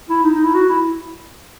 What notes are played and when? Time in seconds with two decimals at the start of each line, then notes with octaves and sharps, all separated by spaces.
0.09 E4
0.24 D#4
0.34 D#4
0.44 E4
0.54 F#4
0.69 E4